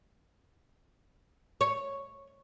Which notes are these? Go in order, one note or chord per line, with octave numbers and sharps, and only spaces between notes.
C#5